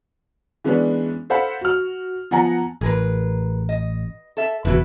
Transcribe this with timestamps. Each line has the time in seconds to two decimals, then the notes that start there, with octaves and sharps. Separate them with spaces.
0.64 E3 G#3 B3 C#4 D4 B4
1.30 A4 C5 F5 F#5 B5
1.61 F#4 F6
2.31 F3 B3 F#5 G#5 A#5
2.81 A1 G#4 A#4 B4
3.69 D#5
4.37 A4 E5
4.65 F#1 E2 B2 E4 B4